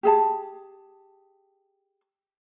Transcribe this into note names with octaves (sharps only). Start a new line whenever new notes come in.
G4 G#4 A5